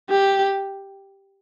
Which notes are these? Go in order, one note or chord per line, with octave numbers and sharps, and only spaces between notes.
G4